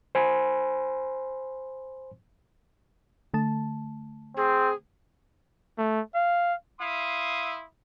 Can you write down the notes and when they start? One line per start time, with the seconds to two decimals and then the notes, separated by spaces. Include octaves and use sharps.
0.15 C5 G#5 B5 C6
3.34 D3 A3 A5
4.37 C4 G#4
5.78 A3
6.15 F5
6.79 E4 E5 F5 C6 D#6